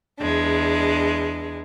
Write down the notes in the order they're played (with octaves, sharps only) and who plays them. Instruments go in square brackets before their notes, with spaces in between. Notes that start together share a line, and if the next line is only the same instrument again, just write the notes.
[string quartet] E2 G#3 D4